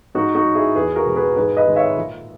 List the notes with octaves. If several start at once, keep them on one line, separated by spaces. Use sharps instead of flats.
G#2 D#4 F#4
D#4 F#4
F#3
E4 G#4
E2 G#4 B4
F#4 A#4
B2 G#3
G#4 B4
G#2 G#4 B4
B4 D#5
D#3 G#3
C#5 E5
A#2